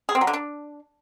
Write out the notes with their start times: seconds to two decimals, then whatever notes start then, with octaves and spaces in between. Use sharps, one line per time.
0.09 G#4
0.15 C4
0.21 F#3
0.27 D3
0.33 D4